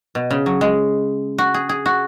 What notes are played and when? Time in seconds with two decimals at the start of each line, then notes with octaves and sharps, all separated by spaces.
0.15 B2
0.31 C#3
0.46 F#3
0.61 G#3
1.38 F#4
1.54 G#4
1.69 G#4
1.86 F#4